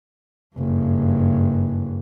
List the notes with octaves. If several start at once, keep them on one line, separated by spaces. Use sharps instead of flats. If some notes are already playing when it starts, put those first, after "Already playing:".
F#1 G2